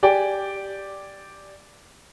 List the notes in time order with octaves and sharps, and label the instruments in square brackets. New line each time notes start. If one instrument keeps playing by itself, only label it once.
[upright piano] G4 D5 G5 G#5